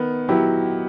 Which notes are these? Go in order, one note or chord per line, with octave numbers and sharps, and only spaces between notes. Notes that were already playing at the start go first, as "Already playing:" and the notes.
Already playing: D#3 B3
F#3 E4 G4